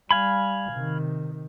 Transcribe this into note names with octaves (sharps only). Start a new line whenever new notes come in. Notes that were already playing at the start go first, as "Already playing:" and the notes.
G3 F5 G#5 B5
C3 D#3